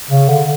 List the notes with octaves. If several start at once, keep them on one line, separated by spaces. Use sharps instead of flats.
C#3
D3